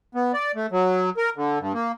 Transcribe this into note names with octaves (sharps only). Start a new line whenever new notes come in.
B3
D5
A3
F#3
A#4
D3
G2
A#3